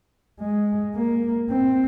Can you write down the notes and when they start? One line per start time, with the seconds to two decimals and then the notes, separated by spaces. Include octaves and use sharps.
0.40 G#3
0.95 A#3
1.50 C4